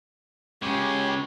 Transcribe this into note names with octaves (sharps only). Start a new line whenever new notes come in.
C#3 G#3 G4 C#5